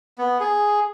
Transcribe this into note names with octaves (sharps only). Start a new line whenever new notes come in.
B3
G#4